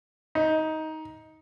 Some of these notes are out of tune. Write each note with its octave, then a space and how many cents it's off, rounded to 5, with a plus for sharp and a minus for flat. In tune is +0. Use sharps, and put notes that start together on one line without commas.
D#4 +15